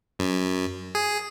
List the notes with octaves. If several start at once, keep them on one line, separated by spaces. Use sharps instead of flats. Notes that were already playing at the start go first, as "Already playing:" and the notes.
F#2
G#4